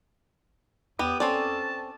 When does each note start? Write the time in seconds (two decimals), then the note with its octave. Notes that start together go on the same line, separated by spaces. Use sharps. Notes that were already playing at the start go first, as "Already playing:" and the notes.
0.99 E2 B3 G4 D#6
1.20 C4 C#4 A4 D5 A5